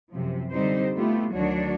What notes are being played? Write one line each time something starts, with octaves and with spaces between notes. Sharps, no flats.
F#2 C3 F3
D3 G3 C4 D#4 G4 C5
A3 B3 E4 F4 G4
D2 D#3 F#3 D4 F#4 C#5